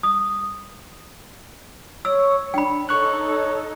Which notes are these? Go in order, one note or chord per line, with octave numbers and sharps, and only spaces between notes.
D#6
C#5 E6
D4 G5 B5
D#4 A4 C#5 C#6 F#6